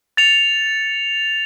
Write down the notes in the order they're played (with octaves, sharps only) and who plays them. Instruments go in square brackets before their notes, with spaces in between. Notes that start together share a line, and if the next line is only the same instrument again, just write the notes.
[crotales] A6 C#7 F7